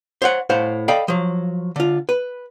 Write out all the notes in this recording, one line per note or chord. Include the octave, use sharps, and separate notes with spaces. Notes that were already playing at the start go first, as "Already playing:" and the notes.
C5 C#5 F5 F#5
A2 C5 F5 F#5
A4 D5 D#5 F5 G5 B5
F3 F#3
D3 F4
B4